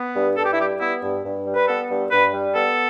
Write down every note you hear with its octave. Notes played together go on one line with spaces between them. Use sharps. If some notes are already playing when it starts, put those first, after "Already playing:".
Already playing: B3
G2
G2 A4
G4
E4
G3 G4
B3 E4
G2
G2
G3
B4
B3 A4
G2
G2 B4
G3
B3 A4